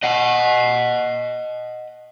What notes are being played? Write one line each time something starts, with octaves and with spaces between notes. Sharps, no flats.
D#5 F#5